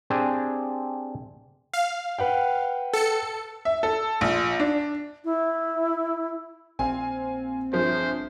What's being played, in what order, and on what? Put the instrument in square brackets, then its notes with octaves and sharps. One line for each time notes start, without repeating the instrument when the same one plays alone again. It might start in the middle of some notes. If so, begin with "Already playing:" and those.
[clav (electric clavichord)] C4 D4 G4 G#4 C5
[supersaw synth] F5
[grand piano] B4 F#5 G5
[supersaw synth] A4 C#7
[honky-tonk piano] E5
A4
A#1
D4
[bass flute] E4
[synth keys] A#1 C4 [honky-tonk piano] F5 G#5
[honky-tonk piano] G1 F3 G#4 [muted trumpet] C5